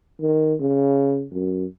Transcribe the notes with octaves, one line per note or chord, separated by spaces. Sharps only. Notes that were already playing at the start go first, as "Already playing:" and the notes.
D#3
C#3
F#2